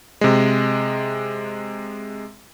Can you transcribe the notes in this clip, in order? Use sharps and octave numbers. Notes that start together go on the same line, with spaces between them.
C3 G#3